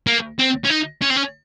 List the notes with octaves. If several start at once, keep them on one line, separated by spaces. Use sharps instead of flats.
A#3
C4
C#4
D#4
C#4
C4
C#4